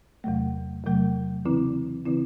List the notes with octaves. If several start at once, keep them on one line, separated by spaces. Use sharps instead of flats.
E2 C3 F#3 A3
E2 C3 F#3 A3
C#3 E3 C4 E4
C#3 E3 C4 E4